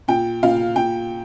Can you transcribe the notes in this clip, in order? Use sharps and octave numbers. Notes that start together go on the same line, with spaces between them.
A#2 G5
A#2 F5
A#2 G5